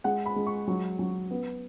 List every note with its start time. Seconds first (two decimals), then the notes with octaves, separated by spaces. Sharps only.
0.04 G#3 F#5
0.26 B5
0.36 G#3
0.47 C#6
0.68 F#3
0.99 F#3
1.31 B3